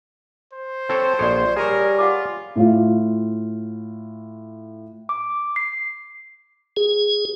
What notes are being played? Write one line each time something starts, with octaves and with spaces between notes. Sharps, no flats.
C5
C4 A4 C#5
A#1 A4 C#5 D5
G3 G#4 A#4 C#5
F4 F#5 D6
A2 F4
D6
C7
G#4